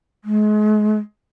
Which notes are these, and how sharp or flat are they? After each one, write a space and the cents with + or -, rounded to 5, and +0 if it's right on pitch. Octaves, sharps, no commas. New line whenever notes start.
G#3 +35